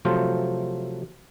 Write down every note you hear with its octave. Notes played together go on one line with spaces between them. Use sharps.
C3 F3 F#3 A3 F4 C5